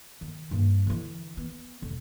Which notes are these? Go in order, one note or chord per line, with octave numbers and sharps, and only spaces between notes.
D#3
G2 A#3
D3 E3
B3
E1 D3